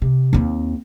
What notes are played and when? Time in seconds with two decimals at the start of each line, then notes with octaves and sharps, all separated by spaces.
0.02 C3
0.33 D#2 C4